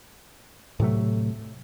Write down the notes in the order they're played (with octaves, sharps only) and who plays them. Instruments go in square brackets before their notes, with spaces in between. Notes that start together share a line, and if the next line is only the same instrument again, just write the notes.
[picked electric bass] A2 C3 F#3 A3